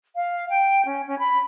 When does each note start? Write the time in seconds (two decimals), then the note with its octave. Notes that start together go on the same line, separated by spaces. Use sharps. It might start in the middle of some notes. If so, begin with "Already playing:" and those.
0.15 F5
0.49 G5
0.85 C#4
1.06 C#4
1.19 B5